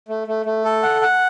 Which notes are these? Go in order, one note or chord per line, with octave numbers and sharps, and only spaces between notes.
A3
A3
A3
A4
F#5
F#5